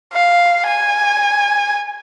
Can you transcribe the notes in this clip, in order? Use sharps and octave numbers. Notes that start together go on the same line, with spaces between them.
F5
G#5